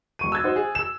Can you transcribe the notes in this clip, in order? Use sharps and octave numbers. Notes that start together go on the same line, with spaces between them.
E1 C#6 D#7
E6 F#6 G#6 A6
D#4 F#4 C5
G#4
E6 E7